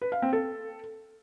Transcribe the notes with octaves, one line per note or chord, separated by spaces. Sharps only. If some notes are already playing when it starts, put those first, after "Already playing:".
B4
F5
C4
A4